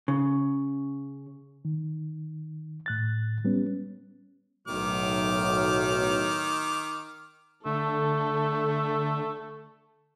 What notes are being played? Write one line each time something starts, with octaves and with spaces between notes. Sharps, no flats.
C#3
D#3
A2 F#6 A6
G3 B3 C#4
B1 A2 D#3 F#3 D6 F6
D3 A3 A4